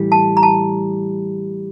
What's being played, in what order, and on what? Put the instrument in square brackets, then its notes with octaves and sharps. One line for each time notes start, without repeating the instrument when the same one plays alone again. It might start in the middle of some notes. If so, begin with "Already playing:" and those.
Already playing: [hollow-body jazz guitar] A2 E3 G3
[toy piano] A5
A#5
A5